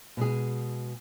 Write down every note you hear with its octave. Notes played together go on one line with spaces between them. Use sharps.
B2 G#3 G#4